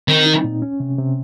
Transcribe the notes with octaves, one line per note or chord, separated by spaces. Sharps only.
D#3 C4
D#4
A#2
C#4
C3
C3